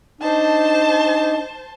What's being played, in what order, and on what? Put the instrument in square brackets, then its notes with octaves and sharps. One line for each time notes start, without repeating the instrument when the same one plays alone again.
[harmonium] D4 D#4 [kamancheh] C5 A5